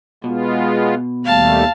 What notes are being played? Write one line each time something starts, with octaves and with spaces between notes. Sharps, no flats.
B2 G#3 B3 F4
D#2 G3 A3 F5 A5